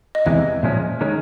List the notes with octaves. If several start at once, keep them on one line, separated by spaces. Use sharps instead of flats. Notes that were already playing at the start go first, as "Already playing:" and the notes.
D#5
E2 C3 E3 G#3 E5
A#2 F3 G#3 C#4
D#3 G#3 C#4